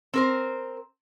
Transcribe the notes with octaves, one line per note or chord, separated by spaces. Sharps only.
C4 A#4 C5